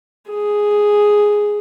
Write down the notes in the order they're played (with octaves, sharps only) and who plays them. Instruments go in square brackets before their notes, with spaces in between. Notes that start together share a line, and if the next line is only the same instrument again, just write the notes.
[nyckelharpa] G#4